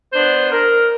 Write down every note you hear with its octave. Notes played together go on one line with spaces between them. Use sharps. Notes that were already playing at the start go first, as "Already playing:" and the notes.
B3 D4 C5
A#4